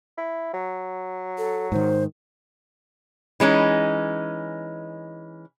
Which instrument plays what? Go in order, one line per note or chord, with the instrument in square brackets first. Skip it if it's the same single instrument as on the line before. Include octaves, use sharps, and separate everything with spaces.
[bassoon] E4
F#3
[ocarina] A4
[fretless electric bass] G#2 D#3 [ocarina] C5
[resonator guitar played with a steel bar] E3 G#3 C#4 D#4